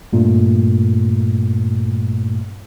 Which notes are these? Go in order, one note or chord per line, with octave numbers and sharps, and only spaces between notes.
G2 A#2 A3